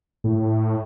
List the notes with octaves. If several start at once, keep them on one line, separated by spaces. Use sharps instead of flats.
A2